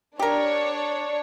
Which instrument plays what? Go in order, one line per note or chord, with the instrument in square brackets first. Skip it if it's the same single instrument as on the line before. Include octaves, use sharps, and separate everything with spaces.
[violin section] D4 C#5 [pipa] G4 A#4